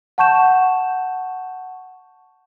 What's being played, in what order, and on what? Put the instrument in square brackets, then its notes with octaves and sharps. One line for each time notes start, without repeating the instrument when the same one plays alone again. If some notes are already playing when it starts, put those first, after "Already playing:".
[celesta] F#5 A5 C#6 G6 E7